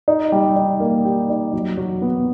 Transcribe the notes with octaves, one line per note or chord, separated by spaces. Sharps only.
D#4
G3
D#4
A#3
G4
D#4
F#3
F#3
B3